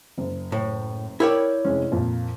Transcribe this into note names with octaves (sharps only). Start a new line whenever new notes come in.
F#1
A2
E4 A#4 C#5 D5 G5
F1 G#3 C#4
F2 A#2